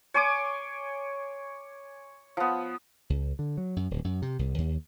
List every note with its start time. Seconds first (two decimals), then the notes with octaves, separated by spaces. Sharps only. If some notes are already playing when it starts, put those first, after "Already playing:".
0.14 C#5 G#5 C6 D6
2.37 F3 B3
3.10 C#2
3.39 D3
3.57 F#3
3.76 F#2
3.91 D1
4.04 F#2
4.22 C3
4.39 C2
4.58 D#2